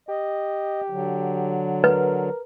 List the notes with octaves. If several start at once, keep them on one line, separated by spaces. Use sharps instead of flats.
G4 D#5
D3 F#3
A#4 B4